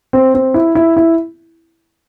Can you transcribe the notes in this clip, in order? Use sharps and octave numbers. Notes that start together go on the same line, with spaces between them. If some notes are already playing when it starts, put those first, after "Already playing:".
C4
C4
E4
E4
E4